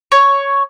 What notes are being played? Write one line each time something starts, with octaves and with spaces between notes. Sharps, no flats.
C#5